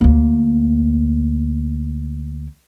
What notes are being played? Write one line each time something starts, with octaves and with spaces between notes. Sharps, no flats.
D2 A#3